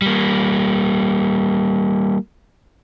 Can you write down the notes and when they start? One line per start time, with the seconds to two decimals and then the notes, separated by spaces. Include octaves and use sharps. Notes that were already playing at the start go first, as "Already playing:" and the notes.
0.02 G3 A#3